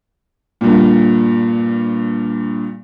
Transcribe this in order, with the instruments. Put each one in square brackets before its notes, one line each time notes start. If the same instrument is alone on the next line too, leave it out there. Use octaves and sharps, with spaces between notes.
[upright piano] G2 A#2